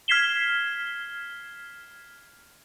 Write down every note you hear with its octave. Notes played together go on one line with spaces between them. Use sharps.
F6 G#6 B6 C7 E7 G7